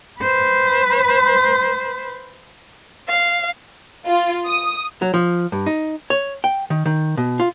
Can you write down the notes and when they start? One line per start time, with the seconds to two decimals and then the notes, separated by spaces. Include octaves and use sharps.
0.21 B4 C5
3.09 F5
4.06 F4
4.46 D#6
5.02 F#3
5.14 F3
5.52 G2
5.66 D#4
6.10 C#5
6.44 G5
6.70 D#3
6.86 D#3
7.17 B2
7.40 F4